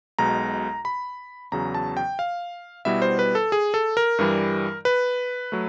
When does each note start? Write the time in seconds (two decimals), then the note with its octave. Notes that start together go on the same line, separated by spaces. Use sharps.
0.19 B1 B2 G#3 A#5
0.85 B5
1.52 E2 C#3 F#3 A#5
1.74 A5
1.97 G5
2.19 F5
2.85 B2 G3 B3 E4 E5
3.02 C5
3.19 B4
3.35 A4
3.52 G#4
3.74 A4
3.97 A#4
4.19 G2 E3 G3
4.85 B4
5.52 F#3 A3